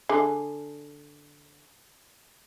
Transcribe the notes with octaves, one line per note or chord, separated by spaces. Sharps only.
D3 G#4